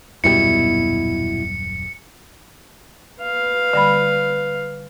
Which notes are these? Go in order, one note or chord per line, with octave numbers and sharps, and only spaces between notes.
D#1 F#2 B2 G3 E4 C#7
B4 F5
D3 G3 B5